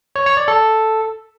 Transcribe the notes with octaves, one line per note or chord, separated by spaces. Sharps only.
C#5
C#5
D5
A4